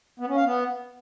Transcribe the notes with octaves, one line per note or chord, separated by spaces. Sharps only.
B3
C#4
F5
B3